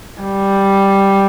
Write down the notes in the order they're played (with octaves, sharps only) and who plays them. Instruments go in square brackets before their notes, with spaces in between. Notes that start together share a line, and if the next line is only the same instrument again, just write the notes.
[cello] G3